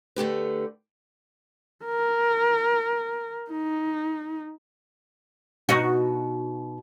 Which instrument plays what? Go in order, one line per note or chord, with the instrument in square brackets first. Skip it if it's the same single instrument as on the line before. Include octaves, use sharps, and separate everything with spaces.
[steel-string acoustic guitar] D3 A3 G4 B4
[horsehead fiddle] A#4
D#4
[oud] B2 D#4 F#4